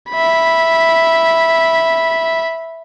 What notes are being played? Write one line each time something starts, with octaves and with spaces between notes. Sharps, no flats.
E5 B5